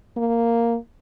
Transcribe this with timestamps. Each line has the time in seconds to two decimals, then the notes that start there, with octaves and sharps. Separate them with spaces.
0.17 A#3